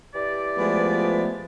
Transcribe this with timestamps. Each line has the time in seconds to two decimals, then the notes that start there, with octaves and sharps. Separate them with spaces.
0.15 E3 G4 D5
0.58 F3 G#3 A3 B3